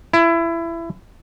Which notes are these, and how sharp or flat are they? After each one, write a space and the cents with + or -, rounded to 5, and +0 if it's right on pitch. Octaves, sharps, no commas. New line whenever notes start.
E4 +20